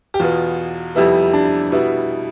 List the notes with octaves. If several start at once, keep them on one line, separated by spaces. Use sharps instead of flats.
G4
E2 B2 B3 F4
F2 C3 G3 B3 E4
D4
B2 G3 B3 E4